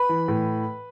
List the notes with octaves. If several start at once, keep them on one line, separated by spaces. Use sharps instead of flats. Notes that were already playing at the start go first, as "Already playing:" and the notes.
Already playing: B4 B5
E3
A2